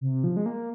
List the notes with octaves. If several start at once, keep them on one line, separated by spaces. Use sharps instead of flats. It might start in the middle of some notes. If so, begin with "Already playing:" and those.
C3
F3
G#3
A#3